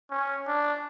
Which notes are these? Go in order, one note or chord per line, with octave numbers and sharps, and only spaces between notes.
C#4
D4